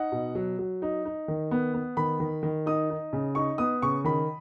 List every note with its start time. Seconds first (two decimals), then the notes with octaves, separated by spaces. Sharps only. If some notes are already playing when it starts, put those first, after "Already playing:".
Already playing: D#4 F#5
0.12 B2
0.35 F#3
0.59 F#3
0.82 D#4
1.05 D#4
1.28 D#3
1.51 B3
1.74 B3
1.97 D#3 B5
2.20 D#3
2.43 D#3
2.66 D#4 D#6
2.90 D#4
3.13 C#3
3.35 D#4 C#6
3.58 B3 D#6
3.82 C#3 C#6
4.04 D#3 B5